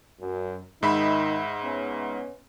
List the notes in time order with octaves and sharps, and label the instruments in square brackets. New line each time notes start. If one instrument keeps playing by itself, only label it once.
[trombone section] F#2
[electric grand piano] G#2 E5 B5 [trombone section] D#3 D#4
[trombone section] B3 C#4